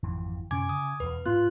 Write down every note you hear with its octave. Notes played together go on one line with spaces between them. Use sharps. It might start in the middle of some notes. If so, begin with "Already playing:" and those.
G#1 F2 E3
F#2 C3 C#4 G#5 D6 G#6
C#3 D#6
E1 E2 B4
G#2 B3 F4 F#6